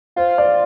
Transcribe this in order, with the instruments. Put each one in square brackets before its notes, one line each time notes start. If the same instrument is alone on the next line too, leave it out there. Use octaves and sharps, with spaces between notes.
[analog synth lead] F4 [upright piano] C5
[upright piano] D5